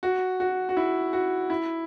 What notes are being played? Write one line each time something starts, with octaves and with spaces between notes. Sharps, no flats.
F#4
F#4
F#4
E4
F#4
E4